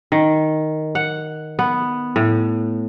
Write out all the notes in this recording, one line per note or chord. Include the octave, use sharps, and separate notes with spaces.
D#3
F#5
B3
A2